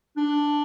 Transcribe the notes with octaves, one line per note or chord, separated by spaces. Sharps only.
D4